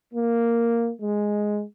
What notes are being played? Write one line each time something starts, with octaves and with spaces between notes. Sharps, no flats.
A#3
G#3